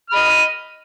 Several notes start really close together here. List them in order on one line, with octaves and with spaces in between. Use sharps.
F6 B5 D#5